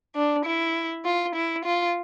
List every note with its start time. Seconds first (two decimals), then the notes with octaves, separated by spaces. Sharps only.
0.15 D4
0.45 E4
1.05 F4
1.35 E4
1.65 F4